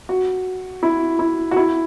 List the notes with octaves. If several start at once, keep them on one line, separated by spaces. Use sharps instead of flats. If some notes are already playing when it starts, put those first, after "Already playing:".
F#4
E4
E4
F#4
E4